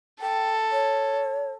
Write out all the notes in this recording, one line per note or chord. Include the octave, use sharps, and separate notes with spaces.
A4 G5
C#5